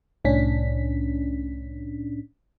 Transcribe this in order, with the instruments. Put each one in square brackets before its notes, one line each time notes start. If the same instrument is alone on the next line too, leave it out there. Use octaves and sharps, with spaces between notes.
[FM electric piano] C2 A2 C#4 D4 B6